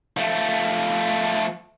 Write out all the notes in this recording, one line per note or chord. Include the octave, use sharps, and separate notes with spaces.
F3 A3